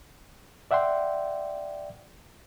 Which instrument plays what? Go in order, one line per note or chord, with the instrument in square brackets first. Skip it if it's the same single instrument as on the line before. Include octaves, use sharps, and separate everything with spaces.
[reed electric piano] D5 E5 F#5 G5 C6